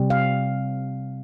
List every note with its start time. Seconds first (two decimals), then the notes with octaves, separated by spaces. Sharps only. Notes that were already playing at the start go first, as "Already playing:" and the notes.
Already playing: C3 G3 C4
0.10 F5